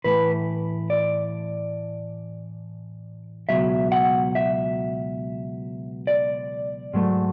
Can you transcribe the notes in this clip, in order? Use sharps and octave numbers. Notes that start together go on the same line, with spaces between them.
A2 E3 A3 B4
D5
C#2 B2 F#3 E5
F#5
E5
D5
G#2 F#3 A3